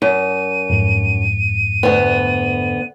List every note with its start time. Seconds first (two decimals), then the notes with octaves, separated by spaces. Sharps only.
0.02 F#2 D#7
0.70 F2 G#2
1.83 D2 B3